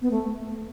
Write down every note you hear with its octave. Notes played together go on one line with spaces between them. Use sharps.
B3
A3